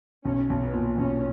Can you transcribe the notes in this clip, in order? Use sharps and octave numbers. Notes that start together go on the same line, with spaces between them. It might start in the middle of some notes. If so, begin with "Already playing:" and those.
B1 C#4
B1
B3
A#2
B1 C#4